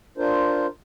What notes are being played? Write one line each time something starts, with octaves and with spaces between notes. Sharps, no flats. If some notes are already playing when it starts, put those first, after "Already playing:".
D4 F4 A#4 C5